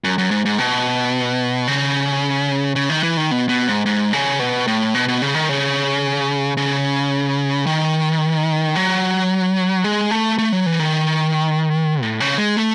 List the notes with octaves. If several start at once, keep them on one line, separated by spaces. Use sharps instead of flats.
F#2
F#2
G#2
G#2
B2
C#3
C#3
D#3
E3
D#3
B2
B2
G#2
G#2
C#3
B2
A2
B2
B2
C#3
D#3
C#3
C#3
D#3
F#3
G#3
A3
A3
F#3
E3
D#3
A2
C#3
G#3
A3